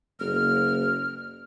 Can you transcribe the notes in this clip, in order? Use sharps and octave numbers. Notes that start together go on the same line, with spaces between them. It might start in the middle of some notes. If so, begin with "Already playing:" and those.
F#1 F6